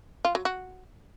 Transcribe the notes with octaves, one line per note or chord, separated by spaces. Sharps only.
F4
F#3
F#4